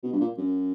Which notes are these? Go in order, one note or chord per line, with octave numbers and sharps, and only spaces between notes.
B2
G2
A#2
F#2